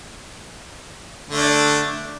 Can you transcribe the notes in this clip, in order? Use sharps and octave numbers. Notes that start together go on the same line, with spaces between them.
D3 A3 D4